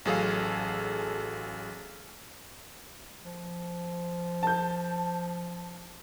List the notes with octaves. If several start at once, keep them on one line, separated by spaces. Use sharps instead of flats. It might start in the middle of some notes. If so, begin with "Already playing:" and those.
A1 F#3 G#4 A4 F5
F3
A5 G6